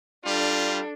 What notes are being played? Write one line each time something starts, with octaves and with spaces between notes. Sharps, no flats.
G3 D4 F4 A4